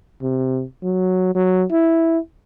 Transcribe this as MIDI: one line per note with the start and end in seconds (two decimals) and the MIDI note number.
0.22 0.63 48
0.82 1.33 54
1.35 1.63 54
1.71 2.18 64